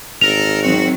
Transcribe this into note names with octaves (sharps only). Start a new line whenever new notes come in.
G#1 A4 A#4 F7
D#3 F#3 C4 F#4